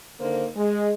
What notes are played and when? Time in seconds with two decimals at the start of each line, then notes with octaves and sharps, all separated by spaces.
0.20 D3 D#3 A#3 C5
0.56 G#3